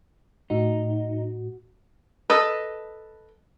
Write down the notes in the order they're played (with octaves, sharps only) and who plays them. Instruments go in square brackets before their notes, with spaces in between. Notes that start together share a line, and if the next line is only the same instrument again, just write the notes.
[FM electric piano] A2 F#4 [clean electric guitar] D#4
[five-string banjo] A4 B4 D#5